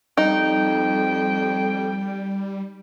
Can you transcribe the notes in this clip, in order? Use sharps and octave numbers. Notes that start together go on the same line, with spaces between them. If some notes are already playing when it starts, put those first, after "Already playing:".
F2 G3 D#4 G5